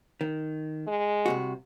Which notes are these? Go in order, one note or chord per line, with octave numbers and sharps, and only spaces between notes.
D#3
G#3
C2 C3 F#4